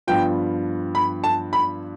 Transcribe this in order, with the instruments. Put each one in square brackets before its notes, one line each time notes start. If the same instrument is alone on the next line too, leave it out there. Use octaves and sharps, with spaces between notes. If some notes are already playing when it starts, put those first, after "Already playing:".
[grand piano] G2 F3 B3 F4 [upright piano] G5
[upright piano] B5
A5
B5